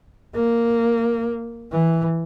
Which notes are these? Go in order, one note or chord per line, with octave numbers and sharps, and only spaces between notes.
A#3
E3